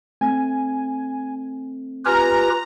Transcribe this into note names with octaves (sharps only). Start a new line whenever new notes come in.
A3 C4 G#5
F4 G4 B4 G#5 A#5 F6